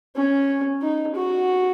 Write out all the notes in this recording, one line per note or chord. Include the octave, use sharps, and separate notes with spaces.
C#4
D#4
F#4